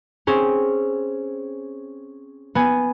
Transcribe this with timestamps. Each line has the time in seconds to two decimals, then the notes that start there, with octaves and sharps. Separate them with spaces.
0.27 C4 C#4 G#4
2.55 B3 G#5